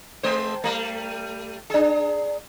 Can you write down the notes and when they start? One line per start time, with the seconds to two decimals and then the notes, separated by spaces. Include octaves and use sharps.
0.23 G#3 C5
0.64 G3 A3
1.70 D4 G#4